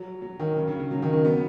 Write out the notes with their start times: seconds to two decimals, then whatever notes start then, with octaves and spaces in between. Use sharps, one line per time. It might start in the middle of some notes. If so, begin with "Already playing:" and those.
Already playing: F#3
0.22 F#3
0.40 D#3
0.56 C#3
0.68 C#3
0.79 C#3
0.91 F#3
1.02 D#3
1.13 D#3
1.25 B3